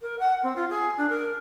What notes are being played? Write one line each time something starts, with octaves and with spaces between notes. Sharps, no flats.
A#4
F#5
C4
F4
G#4
D4
A#4